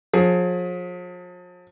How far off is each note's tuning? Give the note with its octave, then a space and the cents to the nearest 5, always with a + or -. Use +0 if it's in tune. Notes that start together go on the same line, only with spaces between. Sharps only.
F3 +40 G#4 +25